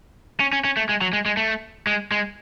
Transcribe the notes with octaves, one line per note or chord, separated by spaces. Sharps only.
C#4
C#4
C#4
A3
G#3
F#3
G#3
G#3
A3
G#3
G#3